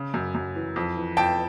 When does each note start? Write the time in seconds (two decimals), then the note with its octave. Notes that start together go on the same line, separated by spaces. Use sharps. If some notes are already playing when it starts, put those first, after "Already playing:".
Already playing: C#3
0.14 F#2
0.35 F#2
0.55 E3
0.76 F2
0.97 E3
1.17 F2 G5 A5